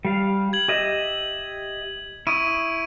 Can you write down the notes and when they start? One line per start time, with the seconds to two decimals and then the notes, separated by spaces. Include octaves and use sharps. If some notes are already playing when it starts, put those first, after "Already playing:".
0.05 G3 F5
0.53 G#6 F#7
0.68 G4 D#5 E5
2.27 E4 C#6 D#6 D7 D#7